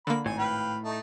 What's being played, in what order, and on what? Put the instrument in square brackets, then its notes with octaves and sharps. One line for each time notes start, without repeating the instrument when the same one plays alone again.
[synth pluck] D3 A#3 [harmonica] B5
[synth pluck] G#1 [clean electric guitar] A2 [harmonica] G#5
[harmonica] B4 F5 G5
A3 D#4